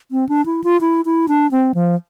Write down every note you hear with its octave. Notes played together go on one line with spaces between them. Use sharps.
C4
D4
E4
F4
E4
E4
D4
C4
F3